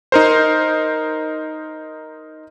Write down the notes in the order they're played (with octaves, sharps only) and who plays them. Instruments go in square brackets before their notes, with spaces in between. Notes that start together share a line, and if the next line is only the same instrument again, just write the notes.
[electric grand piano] D#4 A#4 C5